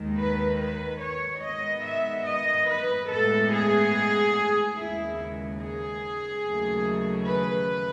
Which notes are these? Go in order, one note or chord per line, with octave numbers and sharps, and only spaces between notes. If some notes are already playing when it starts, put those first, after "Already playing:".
Already playing: D#2 D#3 G#3
B4
B4
C#5
G#2 D#3 G#3 B3 D#5
E5
D#5
B4
A2 G#3 B3 A4
G#4
D#2 C#3 G#3 B3 E4
G#4
D#2 C#3 F#3 A3
B4